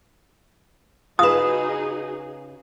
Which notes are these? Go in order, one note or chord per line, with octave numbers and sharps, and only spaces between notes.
C#3 D#4 F4 F#4 G#4 B4 D#6 E7